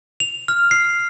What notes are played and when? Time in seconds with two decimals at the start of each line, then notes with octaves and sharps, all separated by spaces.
0.20 F7
0.48 F6
0.71 C7